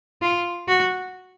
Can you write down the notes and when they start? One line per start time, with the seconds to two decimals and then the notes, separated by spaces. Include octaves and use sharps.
0.22 F4
0.68 F#4